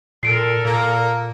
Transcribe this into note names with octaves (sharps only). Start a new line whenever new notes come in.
A#2 A4 A#4 C7 D7
A#2 A#3